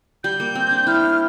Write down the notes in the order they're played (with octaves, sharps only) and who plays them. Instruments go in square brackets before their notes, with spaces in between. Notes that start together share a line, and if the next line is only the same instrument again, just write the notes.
[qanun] G3 [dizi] G6
[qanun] A#3
C4
D4
[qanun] E4 [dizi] F6